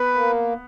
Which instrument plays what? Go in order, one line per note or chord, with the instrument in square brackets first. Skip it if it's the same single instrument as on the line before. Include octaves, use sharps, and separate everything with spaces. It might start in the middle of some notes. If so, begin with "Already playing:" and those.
Already playing: [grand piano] B3 [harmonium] B4
[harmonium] A#3